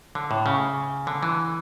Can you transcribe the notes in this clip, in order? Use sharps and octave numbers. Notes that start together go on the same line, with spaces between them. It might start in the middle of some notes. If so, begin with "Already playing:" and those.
D3
A2
C#3
D3
E3